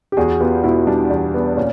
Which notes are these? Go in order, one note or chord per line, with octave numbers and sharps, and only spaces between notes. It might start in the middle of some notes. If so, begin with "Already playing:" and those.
G4
E2 F#4 G#4
B3 F4 G4
B2 E4 F#4
G3 D4
E2
B3
A#2 C#4